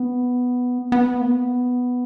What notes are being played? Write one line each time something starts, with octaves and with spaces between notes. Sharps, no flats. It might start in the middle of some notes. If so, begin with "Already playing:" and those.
Already playing: B3
B3
A#3
B3